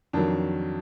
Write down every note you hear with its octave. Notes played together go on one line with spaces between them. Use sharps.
F2 D#3 F#3 D4